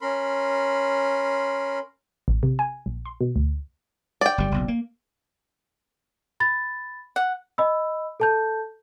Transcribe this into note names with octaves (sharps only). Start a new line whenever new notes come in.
C#4 A#4 B5 C6
A1
C3
G#5
A#1
C6
B2
D2
D5 G5
G1 G3
F#1 B1
A#3
B5 A6
F#5
D#5 B5 E6
A4 A5 G6